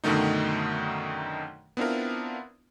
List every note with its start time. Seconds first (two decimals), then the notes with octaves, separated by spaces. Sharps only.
0.04 F#2 B2 D3 D#3 A3 D#4
1.77 B3 C4 D4 E4 F4 A#4